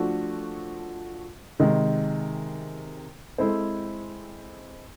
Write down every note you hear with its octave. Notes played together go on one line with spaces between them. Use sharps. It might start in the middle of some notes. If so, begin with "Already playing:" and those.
Already playing: F3 A3 D4 F#4 A4
C3 D#3 G#3
G#3 C4 E4 A4 C5